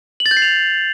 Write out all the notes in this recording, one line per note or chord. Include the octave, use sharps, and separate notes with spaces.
F#7
A6
G6
C7
F7